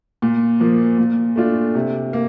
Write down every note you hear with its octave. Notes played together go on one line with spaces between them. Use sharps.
A#2
F3 A#3
A#2
A3 D4 F4
C3
A#3